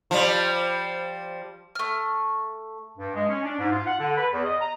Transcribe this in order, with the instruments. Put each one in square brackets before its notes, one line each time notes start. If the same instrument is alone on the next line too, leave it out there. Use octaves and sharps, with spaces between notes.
[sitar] F3 G3
[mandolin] A3 F6
[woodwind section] G2
G#3
C#4
D4
G#2
F4
F#5
D3
B4
E2
D#5
A#5